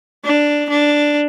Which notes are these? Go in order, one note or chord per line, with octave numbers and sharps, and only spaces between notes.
D4
D4